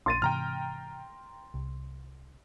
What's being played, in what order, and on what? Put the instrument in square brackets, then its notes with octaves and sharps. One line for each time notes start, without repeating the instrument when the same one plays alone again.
[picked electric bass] A#1 [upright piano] C6 A6 D#7
[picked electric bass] G#2 C3 E3 [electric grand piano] G5 A#5 F6
[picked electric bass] C2